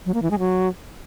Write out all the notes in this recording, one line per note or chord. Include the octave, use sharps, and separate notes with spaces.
F#3
A#3
E3
G#3
F#3